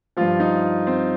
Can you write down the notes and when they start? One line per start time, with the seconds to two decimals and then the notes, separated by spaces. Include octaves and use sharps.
0.17 G2 F3 F4
0.40 D#4
0.87 C4